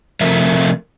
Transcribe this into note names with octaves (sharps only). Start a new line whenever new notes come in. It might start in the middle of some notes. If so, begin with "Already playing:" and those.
C3 F3 A3 A#4 E5